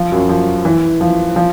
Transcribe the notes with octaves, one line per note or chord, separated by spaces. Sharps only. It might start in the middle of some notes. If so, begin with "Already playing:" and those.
Already playing: F3
F#2 F#3
F3
E3
F3
F3